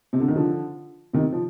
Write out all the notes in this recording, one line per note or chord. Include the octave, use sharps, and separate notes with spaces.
C3
D3
D#3
D3 F3
C3 D#3
F3